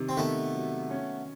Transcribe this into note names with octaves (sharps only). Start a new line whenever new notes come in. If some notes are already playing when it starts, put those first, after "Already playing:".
Already playing: C3 D#3
C4
D#3 A3 B3
F#3
C#4